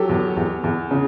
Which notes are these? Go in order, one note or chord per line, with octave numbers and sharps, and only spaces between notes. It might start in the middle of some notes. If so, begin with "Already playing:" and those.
Already playing: F#3 G4 A4
E2
E2
E2
C#3